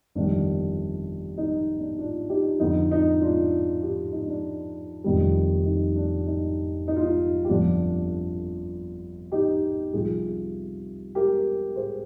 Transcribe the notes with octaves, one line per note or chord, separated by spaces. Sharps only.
G1 F2 D#3 G3 D4
D#4
D4
D4 F4
D#4 G4
F2 D3 F3 D#4
D#4
D4 F4
D#4 G4
D#4
D4
F1 F2 D#3 G3
D#4
D4
D#4
D#4
F4
D#4
G4
G1 F2 D3 F3 D4 F4
D#4 G4
C2 C3 F3 F4 G#4
G4 A#4
G#4 C5